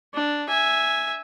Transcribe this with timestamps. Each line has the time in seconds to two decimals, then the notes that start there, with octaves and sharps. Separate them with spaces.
0.14 D4
0.48 E5 G#5